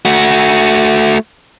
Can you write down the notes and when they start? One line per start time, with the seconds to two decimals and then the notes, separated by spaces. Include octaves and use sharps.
0.05 A3 F#4